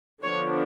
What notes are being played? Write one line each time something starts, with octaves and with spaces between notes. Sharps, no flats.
D3 F3 B3 D4 C#5